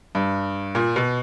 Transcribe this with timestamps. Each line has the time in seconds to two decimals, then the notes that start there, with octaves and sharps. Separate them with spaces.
0.15 G2
0.75 A#2
0.96 B2